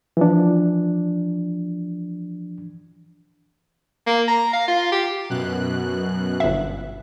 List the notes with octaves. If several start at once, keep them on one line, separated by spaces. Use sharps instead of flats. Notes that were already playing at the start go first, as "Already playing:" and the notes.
E3 F3 D4
A#3
A#5
F5
F4
G4
F#2 B2 F#6
G1 E5